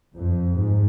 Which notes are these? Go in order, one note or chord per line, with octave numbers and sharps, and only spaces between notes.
F2
G#2